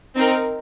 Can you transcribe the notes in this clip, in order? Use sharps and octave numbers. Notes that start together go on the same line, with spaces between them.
C4 D#4 A#4